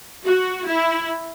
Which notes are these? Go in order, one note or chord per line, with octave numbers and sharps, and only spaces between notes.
F#4
E4